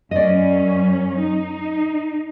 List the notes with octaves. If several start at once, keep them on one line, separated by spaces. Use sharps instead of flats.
F#2 F#3 C#4 D5 D#5
D#4